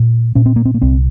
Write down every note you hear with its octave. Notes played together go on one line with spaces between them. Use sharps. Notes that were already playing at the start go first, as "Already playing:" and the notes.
Already playing: A#2
A#2 C#4
C4
A#3
C4
A#3
C2 C4